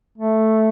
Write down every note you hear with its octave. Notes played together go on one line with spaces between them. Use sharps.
A3